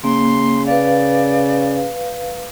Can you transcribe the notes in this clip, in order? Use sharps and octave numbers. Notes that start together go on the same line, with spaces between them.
C#3 A#3 C6
B4 D5 F5